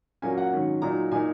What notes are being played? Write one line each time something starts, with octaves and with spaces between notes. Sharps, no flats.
A#2 F#3 A#3 C#4 G#5
F#5
G#2 D#3 F#3 C#4
A#2 F#3 D#4 A#5
A#2 A#3 D#4 G#5